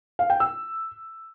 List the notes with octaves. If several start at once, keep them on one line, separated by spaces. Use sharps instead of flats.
F5
G5
E6